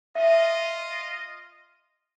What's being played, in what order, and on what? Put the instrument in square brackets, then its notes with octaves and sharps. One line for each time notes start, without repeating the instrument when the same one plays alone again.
[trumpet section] F4 D#5 [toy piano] E5